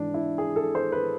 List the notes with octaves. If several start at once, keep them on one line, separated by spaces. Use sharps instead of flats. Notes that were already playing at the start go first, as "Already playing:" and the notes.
Already playing: G#2 E3 D4
E4
G#4
A4
C5
B4